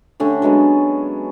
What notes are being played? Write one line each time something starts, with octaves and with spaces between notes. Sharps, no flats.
D3 A3 C#4 G4
F#3 G#3 B3 A4